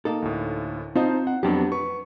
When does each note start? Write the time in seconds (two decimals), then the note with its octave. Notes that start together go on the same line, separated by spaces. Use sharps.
0.05 A#3 D#4 A4
0.22 D2 A2
0.96 C4 D#4 F4 C5 D#5 A5
1.27 F#5
1.43 F2 F#3 B3 D4 G4
1.72 B4 C#6